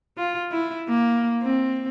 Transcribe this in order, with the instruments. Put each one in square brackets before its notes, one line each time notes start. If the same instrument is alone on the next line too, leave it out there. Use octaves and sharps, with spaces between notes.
[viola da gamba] F4
E4
A#3
C4